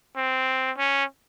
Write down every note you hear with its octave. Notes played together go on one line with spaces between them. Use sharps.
C4
C#4